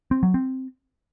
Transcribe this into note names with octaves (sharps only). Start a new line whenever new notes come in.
C4
F#3
C4